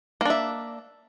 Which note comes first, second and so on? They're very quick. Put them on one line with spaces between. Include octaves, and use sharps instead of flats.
A#3 D4 E5